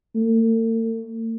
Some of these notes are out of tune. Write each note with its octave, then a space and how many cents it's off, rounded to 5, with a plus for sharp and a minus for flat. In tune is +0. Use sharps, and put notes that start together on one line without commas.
A3 +45